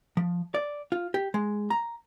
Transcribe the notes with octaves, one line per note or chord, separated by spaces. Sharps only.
F3
D5
F4
G4
G#3
A#5